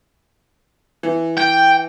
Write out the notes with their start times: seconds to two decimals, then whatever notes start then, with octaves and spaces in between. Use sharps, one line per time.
1.03 E3
1.37 G5